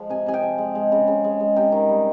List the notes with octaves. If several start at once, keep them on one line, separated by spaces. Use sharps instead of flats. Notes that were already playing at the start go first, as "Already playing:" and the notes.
Already playing: F3 G#3
C3 G#5
C3 G#5
G5
F3
G#3
G#3
C#3
C#3
G#3
G#3
C3 G5
D#3
G3